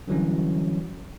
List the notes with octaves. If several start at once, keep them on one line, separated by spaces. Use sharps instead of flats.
D3 E3 F#3 G3 C#4